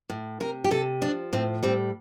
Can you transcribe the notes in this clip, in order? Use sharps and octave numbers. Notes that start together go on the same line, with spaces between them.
A2
C3 A#4
G4
C3 A4
F3 D4
A2 C4
G3 C4